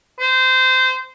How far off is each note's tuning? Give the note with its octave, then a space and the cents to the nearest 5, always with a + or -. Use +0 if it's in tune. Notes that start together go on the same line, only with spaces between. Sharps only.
C5 -20